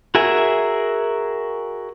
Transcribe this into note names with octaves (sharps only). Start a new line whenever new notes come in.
F#4 G#4 A#4 E5 G#5